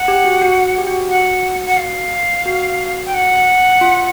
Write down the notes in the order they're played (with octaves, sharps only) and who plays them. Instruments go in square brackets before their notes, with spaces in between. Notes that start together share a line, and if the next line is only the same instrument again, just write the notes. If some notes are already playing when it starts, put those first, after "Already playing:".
Already playing: [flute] F#5
[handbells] G4
F#4
F#4
G4
F#4
[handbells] F#4 [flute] F#5
[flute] F#5
F5
[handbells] F#4
[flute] G5
F#5
[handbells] F4